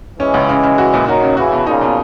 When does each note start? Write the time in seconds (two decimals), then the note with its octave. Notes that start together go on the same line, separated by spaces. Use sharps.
0.19 E3 G#3 C#4
0.34 C#2
0.49 C#3
0.63 C#3
0.78 F#4
0.94 A#2
1.07 D#3 F#3 F#4
1.22 C#3
1.37 C#3 E3 F#4
1.53 B2
1.67 A#2 C#3 D#4
1.81 B2